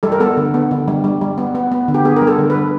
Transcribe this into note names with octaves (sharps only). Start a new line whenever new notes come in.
G3 A4
A#4
B3 A4
D3
B3
D3
G3
G3
G3
B3
B3
B3
D3
G4
B3 G#4
A#4
G3
A4
D3
B4
G3